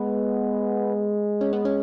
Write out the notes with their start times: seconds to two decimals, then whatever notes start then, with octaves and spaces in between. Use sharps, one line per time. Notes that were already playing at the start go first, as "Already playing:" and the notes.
Already playing: G#3 B3
1.41 C#4
1.53 B3
1.65 C#4